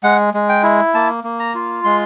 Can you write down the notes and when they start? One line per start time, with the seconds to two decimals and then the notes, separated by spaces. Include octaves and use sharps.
0.03 G#3 F#5
0.34 G#3
0.49 G5
0.63 E4
0.94 A#3 A5
1.24 A#3
1.40 A#5
1.55 F4
1.84 G#3 C6